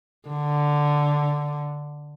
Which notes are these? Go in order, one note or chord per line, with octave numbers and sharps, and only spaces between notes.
D3